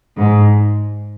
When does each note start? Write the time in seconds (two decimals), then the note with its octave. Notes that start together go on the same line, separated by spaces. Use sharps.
0.16 G#2